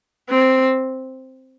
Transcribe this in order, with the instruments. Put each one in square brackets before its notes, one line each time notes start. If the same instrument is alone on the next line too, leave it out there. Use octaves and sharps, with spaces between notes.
[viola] C4